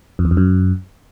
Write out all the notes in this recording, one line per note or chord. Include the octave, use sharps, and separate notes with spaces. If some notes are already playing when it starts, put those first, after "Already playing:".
F2
E2
F2
F#2